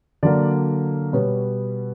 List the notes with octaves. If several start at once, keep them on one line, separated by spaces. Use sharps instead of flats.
D3 F#3 A#3 D5
B2 G3 B3 C#5